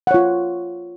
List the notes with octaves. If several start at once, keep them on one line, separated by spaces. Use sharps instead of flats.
F4 C#5 F#5